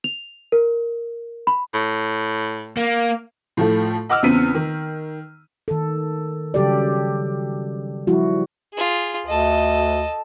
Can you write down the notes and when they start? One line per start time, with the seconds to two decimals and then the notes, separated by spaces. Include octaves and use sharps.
0.04 F7
0.52 A#4
1.47 B5
1.74 A2
2.77 A#3
3.57 A2 F3 A3
4.09 D#5 F#5 D6 E6 F6
4.23 E2 C#3 B3 C4 B6 D#7
4.55 D#3
5.68 D#3 A4
6.54 C#3 F#3 G3 G4 A4 D5
8.07 F3 G3 E4 F#4
8.74 F4 G#4
9.27 D2 A4 D#5